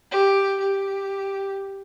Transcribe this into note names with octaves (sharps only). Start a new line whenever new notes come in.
G4
G4